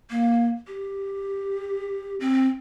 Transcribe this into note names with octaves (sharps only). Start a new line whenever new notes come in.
A#3
G4
C4